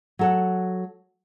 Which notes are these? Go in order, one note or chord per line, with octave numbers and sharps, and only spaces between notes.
F#3 A4 F#5